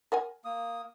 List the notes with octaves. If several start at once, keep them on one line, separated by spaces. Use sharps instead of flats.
A#4 F#5 G#5
A#3 D#6